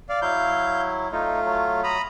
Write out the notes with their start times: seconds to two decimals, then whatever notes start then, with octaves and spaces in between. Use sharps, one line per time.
0.09 D5 F5
0.22 F#3 E4 F5 G6
1.12 A3 D#4 F4
1.45 F#3
1.84 A#5 B5 D#6